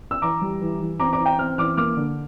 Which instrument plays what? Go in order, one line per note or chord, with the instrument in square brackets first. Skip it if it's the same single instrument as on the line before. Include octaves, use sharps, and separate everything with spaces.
[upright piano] E6
E3 A#5 D6
G3
E3
E3
C4 A#5 D6
A#5 D6
E3
G5 A#5
C4 F6
E3 D6 F6
A#3 D6 F6
D3